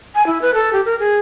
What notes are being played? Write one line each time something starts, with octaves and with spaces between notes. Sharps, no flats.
G#5
E4
B4
A4
G4
A#4
G#4